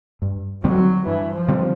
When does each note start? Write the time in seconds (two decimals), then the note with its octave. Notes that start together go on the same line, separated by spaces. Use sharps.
0.22 G2
0.64 D3 F#3 G3 C4
1.06 G2 E3
1.34 F3
1.48 D3 G3 C4